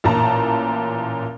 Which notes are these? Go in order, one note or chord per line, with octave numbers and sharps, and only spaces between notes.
A1 A#2 A5 A#5